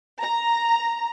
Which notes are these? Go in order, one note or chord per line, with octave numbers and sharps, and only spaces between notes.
A#5